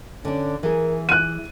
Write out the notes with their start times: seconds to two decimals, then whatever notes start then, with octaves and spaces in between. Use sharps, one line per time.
0.25 D3 C#4 D5
0.63 E3 G#4 A#4
1.09 E4 F#6 D#7